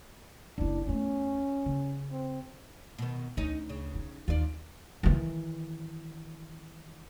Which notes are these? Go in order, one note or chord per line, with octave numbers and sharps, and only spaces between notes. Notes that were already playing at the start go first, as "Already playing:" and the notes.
F#1 D4 E4
E2 A3 C#4
C#3
C4
B2 D#3
D2 C#4 D#4
C#3
D#4
D#2 D#4 F4 D5
D#3 E3